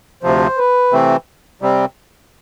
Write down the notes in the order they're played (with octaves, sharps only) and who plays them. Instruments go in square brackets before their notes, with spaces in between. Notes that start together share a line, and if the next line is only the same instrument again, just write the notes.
[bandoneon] D2 C3 F3 [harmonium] C5
[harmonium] B4
[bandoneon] C3 E3 A3 C4
C3 G3 C4